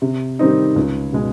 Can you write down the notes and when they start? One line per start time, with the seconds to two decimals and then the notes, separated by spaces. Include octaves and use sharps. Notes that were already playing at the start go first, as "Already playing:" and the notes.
0.02 C3
0.39 D#3 G3 C4 D#4
0.76 C#2
1.13 B2 G#3